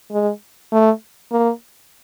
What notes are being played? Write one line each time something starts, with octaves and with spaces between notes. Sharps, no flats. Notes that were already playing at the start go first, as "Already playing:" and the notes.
G#3
A3
A#3